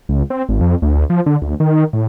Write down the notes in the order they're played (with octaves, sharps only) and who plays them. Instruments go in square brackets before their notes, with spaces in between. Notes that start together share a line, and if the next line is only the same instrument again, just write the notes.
[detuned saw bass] C#2
C4
G#1
F2
D2
D2
F3
D3
D2
D#3
A2